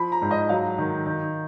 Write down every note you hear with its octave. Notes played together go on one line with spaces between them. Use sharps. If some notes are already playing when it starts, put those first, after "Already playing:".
Already playing: F3 B5
A#5
G#2
D#5
F#3 F5
D#3
D#3